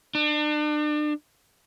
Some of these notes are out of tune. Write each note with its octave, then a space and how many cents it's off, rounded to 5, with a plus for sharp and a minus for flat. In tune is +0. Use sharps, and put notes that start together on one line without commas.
D4 +35